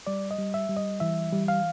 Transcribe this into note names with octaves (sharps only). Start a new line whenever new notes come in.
G3 D5
D#5
G3
E5
G3
D#5
E3 E5
G3
F5